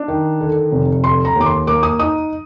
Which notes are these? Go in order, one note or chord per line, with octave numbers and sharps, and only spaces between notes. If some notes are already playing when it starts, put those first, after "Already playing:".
Already playing: D4
D#3
D3
F1
D3 C6
A#5
D#2 D6
C6
A#3 D6
D#6
D#4 D#6